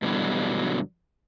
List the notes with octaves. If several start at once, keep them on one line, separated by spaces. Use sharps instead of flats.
G2 B2 D3 E3 F#3 G3